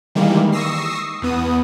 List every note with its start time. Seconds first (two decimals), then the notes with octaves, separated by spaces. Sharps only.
0.15 D#3 E3 G3 G#3 A#3
0.52 C#6 D#6 E6 A#6 C7
1.22 E2 B3 D#6